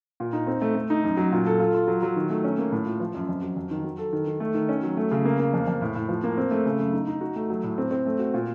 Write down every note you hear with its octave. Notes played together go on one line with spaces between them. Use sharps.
A#2
D#4
C4
A3
A3
D#4
F#2
F#3
A#2
A4
F4
F4
F#3
F#3
D#3
A3
C#4
A#3
A2
F4
F3
F#2
F2
F#3
F2
D#3
F#3
A4
D#3
D#3
A3
D#3
C#4
F#3
A3
C#3
A#3
A#3
F2
F2
A2
A2
F3
A#3
C4
A3
C#3
F#2
D#4
D#4
F#4
A3
F#3
A2
C4
C4
A3
F#4
A#2